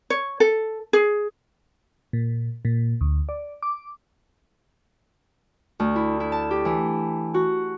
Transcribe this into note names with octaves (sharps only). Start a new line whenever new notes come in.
C#5
A4
G#4
A#2
A#2
D2
D5
D6
D2
E4
E4
A5
G4
E3
F#4